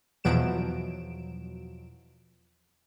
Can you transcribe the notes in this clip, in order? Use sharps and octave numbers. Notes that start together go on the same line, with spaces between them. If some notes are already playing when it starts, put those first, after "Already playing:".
E2 B2 F3 F#3 D7 E7